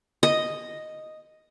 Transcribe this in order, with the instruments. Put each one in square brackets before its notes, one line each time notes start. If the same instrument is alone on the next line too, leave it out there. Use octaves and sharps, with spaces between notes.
[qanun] D#5